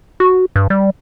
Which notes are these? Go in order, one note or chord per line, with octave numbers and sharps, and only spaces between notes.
F#4
G2
G3